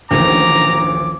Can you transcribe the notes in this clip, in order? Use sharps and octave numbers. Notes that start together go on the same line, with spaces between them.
A1 D2 D#3 F3 A#3 A#5 D6